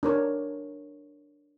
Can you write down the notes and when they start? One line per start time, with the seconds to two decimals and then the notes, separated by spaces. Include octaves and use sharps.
0.03 D4 A#4 C#5